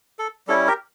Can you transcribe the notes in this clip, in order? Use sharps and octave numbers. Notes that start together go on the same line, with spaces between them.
A4
G3 C#4 E4 A4
G4 A#4